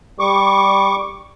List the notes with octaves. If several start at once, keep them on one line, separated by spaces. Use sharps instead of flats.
G3 C#6 D6